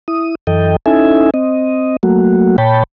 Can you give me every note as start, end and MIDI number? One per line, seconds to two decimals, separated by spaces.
0.08 0.35 64
0.08 0.35 87
0.47 0.76 42
0.47 0.76 52
0.47 0.76 69
0.47 0.76 75
0.47 0.76 79
0.86 1.30 61
0.86 1.30 63
0.86 1.30 64
0.86 1.30 69
0.86 1.30 76
0.86 1.30 80
1.34 1.97 60
1.34 1.97 75
2.03 2.57 54
2.03 2.57 57
2.03 2.57 58
2.03 2.57 66
2.58 2.83 46
2.58 2.83 73
2.58 2.83 79
2.58 2.83 81
2.58 2.83 83